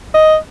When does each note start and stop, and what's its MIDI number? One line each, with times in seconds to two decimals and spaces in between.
0.14 0.36 75